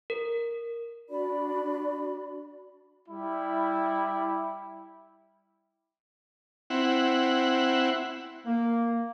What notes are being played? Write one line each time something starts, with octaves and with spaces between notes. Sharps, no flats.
A#4
D4 F#4 D5 B5
G3 E4
C4 E4 F#5
A#3